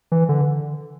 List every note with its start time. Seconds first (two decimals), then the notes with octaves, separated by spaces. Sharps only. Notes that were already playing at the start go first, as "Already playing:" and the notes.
0.12 E3
0.29 D3